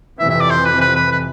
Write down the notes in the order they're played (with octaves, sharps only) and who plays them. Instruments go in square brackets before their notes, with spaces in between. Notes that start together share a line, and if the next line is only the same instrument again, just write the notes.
[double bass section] F2 C3 E3 [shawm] E5
[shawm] E5
D5
C5
B4
B4
B4
B4